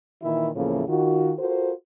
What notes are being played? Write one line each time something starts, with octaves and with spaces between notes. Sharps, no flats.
A#2 D#3 E3 E4
E2 A2 C#3 F3 A3 A#3
D#3 F4 F#4
F4 F#4 A4 A#4 C5